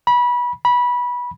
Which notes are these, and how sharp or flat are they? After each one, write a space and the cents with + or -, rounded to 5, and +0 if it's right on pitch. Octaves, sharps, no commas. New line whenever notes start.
B5 -25
B5 -20